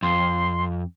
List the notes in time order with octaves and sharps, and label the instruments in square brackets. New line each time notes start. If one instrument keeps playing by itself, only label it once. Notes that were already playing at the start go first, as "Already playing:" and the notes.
[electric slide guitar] F2 [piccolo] C6